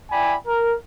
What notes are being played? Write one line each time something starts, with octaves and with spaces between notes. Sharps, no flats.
E4 D5 G5 G#5 B5
A#4